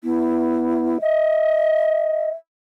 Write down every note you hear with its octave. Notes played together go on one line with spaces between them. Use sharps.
B3 E4
D#5 E5